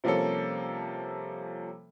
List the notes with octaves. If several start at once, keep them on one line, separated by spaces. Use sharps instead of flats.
C3 F3 G3 A#3 C#4 A4